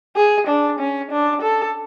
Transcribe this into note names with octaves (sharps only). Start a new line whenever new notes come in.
G#4
D4
C#4
D4
A4